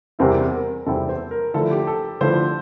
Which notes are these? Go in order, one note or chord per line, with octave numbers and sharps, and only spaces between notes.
E2 C3 G3 C4 E4 A#4
A#4
E2 C3 G3 C4 E4 A4
C5
A#4
D3 F3 A3 E4 A4
G4
A4
D3 F3 A3 E4 C5